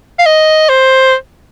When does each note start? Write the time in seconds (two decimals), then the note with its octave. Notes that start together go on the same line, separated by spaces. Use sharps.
0.19 F5
0.26 D#5
0.69 C5